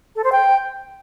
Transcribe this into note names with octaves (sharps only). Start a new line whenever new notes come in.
A4
C5
G5